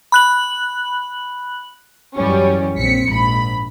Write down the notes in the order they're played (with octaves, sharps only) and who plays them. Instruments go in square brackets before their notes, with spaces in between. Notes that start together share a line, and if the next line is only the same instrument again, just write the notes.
[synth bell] B5 F#6 F#7
[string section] F#2 E3 G3 C#4
A#1 C4 B6 C#7
A#1 G#2 B5